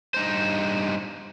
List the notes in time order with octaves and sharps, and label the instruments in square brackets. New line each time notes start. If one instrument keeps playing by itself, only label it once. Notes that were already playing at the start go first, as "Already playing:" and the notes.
[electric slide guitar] G2 D#4 C5